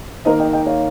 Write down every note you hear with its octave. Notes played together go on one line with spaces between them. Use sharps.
D#3 A#3 D#4 A#4 C5 D#5
D#5 G5
D#5 G5
C#5 F5